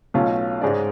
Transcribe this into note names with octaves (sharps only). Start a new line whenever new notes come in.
B1 B2 A3 C#4 F4
G#2 G#3 C#4 G#4 D5